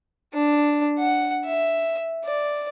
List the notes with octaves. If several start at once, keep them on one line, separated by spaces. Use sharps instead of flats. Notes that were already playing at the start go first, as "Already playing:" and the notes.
D4
F#5
E5
D5